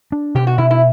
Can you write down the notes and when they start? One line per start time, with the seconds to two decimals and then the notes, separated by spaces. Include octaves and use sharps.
0.12 D4
0.35 B2 G4
0.47 F#4
0.58 B2 E4
0.71 E4